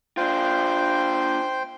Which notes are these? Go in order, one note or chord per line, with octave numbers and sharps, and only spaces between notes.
D4 F4 C5 G5